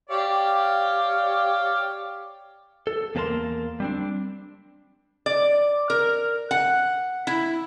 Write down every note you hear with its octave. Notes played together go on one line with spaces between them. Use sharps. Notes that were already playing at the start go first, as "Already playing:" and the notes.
G4 C#5 D5 F5
A4
E2 A#3 B3 A#4 A5 C6
G3 C4 D4
D5
A#4
F#5
E4